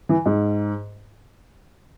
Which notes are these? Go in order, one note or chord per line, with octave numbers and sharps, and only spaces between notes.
E3
G#2